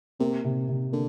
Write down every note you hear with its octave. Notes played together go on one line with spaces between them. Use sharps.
C3 A#3
C3
C3
D3 A#3